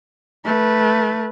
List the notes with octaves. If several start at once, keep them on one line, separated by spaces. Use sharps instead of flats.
A3 B4